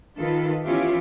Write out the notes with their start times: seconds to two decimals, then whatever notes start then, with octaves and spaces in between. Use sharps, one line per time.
0.17 D#3 F4 A4 B4
0.65 E3 B3 C#4 E4 F4 G4